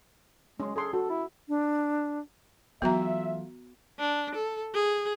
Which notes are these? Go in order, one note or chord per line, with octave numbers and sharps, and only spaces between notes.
G#3 C#4 C6
G#4 A4 C6
F#4 A4
E4
D4
E3 F#3 A3 B3 F4 F#4 E5 A#5
D4
A4
G#4